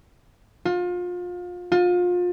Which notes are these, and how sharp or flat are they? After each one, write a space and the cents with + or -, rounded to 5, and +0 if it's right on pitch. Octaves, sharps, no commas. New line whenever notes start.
F4 +30
F4 +30